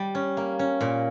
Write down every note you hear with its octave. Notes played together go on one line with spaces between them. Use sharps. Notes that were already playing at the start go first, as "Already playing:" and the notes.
Already playing: G3
C#4
A#3
C#4
A#2